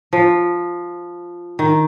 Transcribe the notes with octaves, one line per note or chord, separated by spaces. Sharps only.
F3
D#3